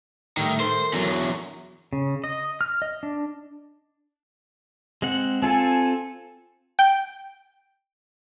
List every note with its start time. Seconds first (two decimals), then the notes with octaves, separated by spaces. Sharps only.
0.37 A2 D#3 G3 A3
0.60 D#3 A4 A#4 C5
0.93 E2 F#3
1.93 C#3
2.24 D#5
2.61 F6
2.82 D#5
3.03 D4
5.02 G#3 C4 F#5
5.42 C4 F4 A4 G#5
6.79 G5